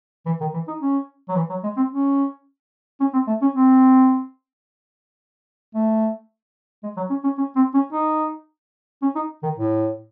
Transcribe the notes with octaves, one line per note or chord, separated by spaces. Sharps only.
E3
D#3
E3
D#4
C#4
F#3
E3
F#3
G#3
C4
C#4
C#4
C4
A3
C#4
C4
A3
G#3
F#3
C#4
C#4
C#4
C4
C#4
D#4
C#4
D#4
D#3
A2